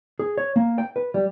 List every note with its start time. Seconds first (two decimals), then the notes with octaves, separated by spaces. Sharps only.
0.19 G#4
0.38 C#5
0.56 A#3
0.78 G5
0.96 B4
1.14 G3